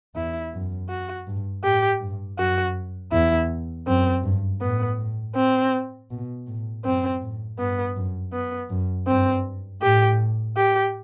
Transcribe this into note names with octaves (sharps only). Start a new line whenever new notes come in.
E2 E4
F#2
F#4
G2
A2 G4
G2
F#2 F#4
E2 E4
F#2 C4
G2
A2 B3
C4
B2
A2
F#2 C4
A2
G2 B3
F#2
B3
F#2
G2 C4
A2 G4
G4